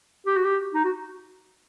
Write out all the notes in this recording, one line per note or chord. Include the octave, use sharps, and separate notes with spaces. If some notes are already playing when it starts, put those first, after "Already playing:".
G4
F#4
G4
D#4
F#4